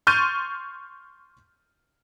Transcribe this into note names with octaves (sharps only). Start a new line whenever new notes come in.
C6 C#6 F6 G6 A6 D#7